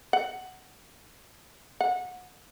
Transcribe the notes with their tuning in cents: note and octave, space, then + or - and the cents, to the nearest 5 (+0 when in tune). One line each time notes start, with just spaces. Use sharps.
F#5 +10
F#5 -25